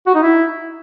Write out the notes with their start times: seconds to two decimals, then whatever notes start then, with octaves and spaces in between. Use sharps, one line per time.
0.07 F#4
0.15 D#4
0.22 E4